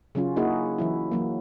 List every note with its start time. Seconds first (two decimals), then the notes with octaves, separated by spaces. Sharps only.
0.15 C#3 F#3 C#4 F4
0.36 A#3 D#4 E4 F#4 G#4
0.78 E3 F#3 E4
1.12 E3 F#3 A#3